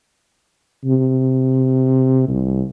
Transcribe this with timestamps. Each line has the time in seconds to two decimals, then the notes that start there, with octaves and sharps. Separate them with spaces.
0.85 C3
2.28 C2